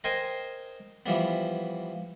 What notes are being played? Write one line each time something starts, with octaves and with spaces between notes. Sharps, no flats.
A#4 C5 D#5 G5 G#5 C6
E3 F3 G3 B3